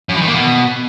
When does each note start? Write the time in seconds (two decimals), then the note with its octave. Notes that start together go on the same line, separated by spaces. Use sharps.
0.09 F#2
0.15 E3
0.21 D#3
0.28 A#3
0.34 B2